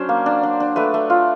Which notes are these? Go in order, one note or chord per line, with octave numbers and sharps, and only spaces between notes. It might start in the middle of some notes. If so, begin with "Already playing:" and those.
Already playing: F#3 C#4 D4 C5
A#3
D4
D4
D4
A3 B4
A3
F4